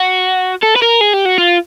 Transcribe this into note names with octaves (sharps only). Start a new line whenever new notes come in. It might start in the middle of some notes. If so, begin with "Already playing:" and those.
Already playing: F#4
A4
B4
A#4
G#4
G4
F#4
F4